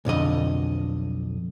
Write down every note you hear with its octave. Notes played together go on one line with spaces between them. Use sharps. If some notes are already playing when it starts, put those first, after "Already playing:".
B1 F2 D3 D#5